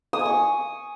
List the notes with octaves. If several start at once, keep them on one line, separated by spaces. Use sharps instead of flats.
D#6
G#5
C#6